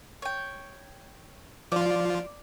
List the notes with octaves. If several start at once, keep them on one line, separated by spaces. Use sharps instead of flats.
C#5 G5
F3 F4 D5